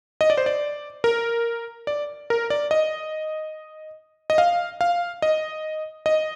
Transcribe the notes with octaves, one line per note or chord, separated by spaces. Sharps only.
D#5
D5
C5
D5
A#4
D5
A#4
D5
D#5
D#5
F5
F5
D#5
D#5